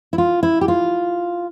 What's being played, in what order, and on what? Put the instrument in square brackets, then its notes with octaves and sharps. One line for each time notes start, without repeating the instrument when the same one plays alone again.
[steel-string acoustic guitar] E4
F4
E4
G4
F4